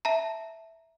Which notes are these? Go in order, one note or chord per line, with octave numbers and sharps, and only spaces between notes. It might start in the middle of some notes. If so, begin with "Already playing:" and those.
E5 A5 A#5